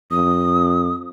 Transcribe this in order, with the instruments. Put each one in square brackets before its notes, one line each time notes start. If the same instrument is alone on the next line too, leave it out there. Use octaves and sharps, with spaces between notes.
[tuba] F2 [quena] D#6